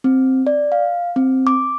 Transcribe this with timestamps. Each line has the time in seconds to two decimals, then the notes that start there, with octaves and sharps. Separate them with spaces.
0.04 C4
0.47 D5
0.72 F5
1.16 C4
1.47 D6